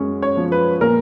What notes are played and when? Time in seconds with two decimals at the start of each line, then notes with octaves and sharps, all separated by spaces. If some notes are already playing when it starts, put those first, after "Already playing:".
Already playing: F#2 G#3 C#4
0.22 C#5
0.37 F3
0.52 B4
0.81 A#2 A#4